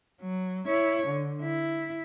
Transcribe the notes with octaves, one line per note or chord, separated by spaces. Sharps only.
F#3
E4 C#5
D3
E4